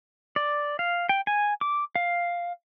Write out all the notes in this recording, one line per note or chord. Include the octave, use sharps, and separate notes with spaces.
D5
F5
G5
G#5
D6
F5